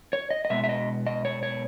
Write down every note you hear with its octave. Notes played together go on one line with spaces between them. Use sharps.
C#5
D#5
D#5
B2 G#3 B3 E5
E5
D#5
D#5
C#5
C#5